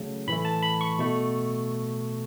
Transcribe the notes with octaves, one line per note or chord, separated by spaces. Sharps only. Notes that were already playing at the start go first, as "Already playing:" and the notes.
Already playing: C#3 F#3 A3
A2 E3 A3 B5
A5
B5
C#6
B2 A3